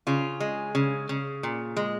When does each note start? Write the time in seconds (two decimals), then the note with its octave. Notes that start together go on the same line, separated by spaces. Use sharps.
0.07 C#3 F4
0.40 G#3
0.75 C#3
1.09 C#3
1.43 A#2
1.77 G#3